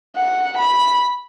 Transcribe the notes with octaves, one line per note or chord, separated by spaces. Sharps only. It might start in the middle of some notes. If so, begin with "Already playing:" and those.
F#5
B5